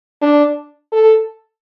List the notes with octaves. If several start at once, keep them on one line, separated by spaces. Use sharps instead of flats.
D4
A4